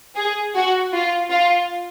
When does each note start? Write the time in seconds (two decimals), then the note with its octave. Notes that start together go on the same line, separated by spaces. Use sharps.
0.16 G#4
0.55 F#4
0.93 F4
1.30 F4